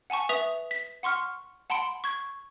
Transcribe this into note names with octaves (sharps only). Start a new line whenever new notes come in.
F#5 G#5 A5 C#6
B4 E5 D#6 B6 F7
B6
F#5 C6 C#6 F6
F#5 A5 B5 C6 D7
C#6 G#6